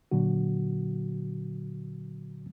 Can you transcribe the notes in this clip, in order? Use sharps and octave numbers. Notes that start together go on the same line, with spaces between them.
A#2 D3 F#3 F#4